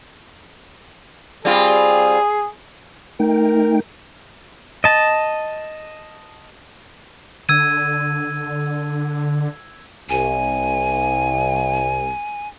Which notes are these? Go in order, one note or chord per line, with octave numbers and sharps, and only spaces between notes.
G3 C4 F4 G#4
A3 D#4 A#4 G5
D#5 A5
D3 E6 G#6 D#7
C2 G#5